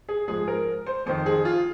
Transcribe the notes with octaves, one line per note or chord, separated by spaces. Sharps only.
G#4
G#2 F3 G#4
A#4
C5
F2 D#3 C5
G#4
F4